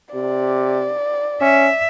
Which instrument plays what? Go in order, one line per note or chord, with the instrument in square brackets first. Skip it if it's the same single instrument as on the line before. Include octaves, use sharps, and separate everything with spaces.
[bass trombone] C3 [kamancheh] D5
[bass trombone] C#4 [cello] E5